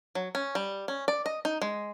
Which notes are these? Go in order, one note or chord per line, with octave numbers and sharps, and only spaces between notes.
F#3
C#4
G3
C#4
D5
D#5
D#4
G#3